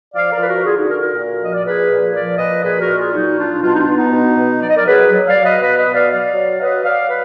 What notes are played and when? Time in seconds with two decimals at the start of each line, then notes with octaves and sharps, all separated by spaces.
0.15 F3 D5 F5
0.31 A#4 D5
0.39 F3 B4
0.48 F#4 A#4
0.64 D3 F4 G#4
0.77 D#4 F#4
0.89 D3 F#4 A#4
1.01 F#4 A#4
1.14 A#2
1.39 F3 D#5
1.54 D5
1.63 A#2 G#4 B4
1.89 A#2
2.13 F3 A#4 D5
2.38 A#2 B4 D#5
2.63 A#2 G#4 B4
2.79 F#4 A#4
2.87 A#2
2.96 F4 G#4
3.12 F#3 D#4 F#4
3.36 F#3 D4 F4
3.62 B2 D4 F4
3.74 D#4
3.78 D4 F4
3.87 B2
3.95 B3 D#4
4.12 B2
4.37 B2
4.61 F#3 D5
4.69 D#5
4.76 A#4 D5
4.86 F#3 G#4 B4
5.10 F#3
5.27 D5 F5
5.36 F#3
5.43 B4 D#5
5.60 B2 B4 D#5
5.77 B4 D#5
5.85 B2
5.94 D5 F5
6.09 F#3 D5 F5
6.34 F#3
6.60 F#3 B4 D#5
6.84 F#3 D5 F5
7.09 B4